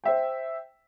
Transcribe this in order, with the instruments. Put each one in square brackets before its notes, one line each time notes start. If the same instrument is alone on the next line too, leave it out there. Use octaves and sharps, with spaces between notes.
[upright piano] C5 E5 G5